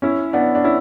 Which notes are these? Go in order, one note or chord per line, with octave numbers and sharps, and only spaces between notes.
C#4 E4
B3 D4
D4
C#4 E4